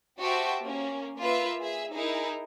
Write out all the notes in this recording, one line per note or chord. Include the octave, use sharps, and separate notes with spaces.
F#4 G4 C5 E5 G5 A5
A#3 C#4
A#3 F4 B4 E5
G#4 E5
D#4 E4 G#4 A#4